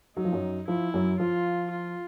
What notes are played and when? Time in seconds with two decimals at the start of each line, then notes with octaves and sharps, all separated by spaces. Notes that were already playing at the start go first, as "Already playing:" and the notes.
0.16 F#3 D#4
0.25 F3
0.32 F#2 F#3
0.68 F3 E4
0.94 F#2 F#3
1.19 F3 F4
1.71 F4